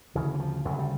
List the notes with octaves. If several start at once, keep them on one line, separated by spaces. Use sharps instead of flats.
D2 C#3 E3
E3
F3
D2 C#3 F#3
G3